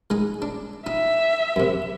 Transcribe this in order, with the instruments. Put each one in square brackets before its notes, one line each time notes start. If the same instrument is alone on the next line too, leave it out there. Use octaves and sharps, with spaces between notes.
[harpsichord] G#3 D#4
D4
[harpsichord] D#4 [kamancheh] E5
[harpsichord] F#2 C3